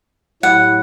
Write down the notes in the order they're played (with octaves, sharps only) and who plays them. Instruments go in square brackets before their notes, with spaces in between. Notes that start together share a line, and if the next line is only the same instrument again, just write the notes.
[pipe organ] A2 F#3 A3 E4 G4 [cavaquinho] F#5